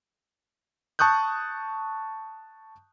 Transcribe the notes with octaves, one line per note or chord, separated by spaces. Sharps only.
A5 C#6 D#6 F#6 G6